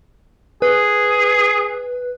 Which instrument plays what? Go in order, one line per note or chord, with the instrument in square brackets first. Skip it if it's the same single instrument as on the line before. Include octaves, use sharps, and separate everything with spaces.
[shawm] G#4 [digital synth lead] B4